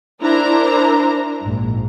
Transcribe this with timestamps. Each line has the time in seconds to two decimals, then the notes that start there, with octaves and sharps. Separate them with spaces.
0.20 D4 E4 A#4 C5 A#5
1.41 A#1 G#2